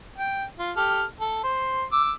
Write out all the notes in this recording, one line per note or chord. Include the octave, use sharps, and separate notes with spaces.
G5
F4
G4 A4 F6
A4
C5
D6 E6